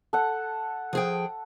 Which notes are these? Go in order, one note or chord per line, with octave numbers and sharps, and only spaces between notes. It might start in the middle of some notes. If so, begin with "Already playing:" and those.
A4 F#5
F3 G#4 G5